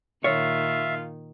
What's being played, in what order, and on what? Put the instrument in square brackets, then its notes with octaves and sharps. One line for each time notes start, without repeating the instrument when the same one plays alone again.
[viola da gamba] A#2 D#3 [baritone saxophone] F4 [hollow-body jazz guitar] C#5 [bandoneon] E5